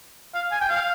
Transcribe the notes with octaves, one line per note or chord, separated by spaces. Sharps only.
F5
G#5
G5
F5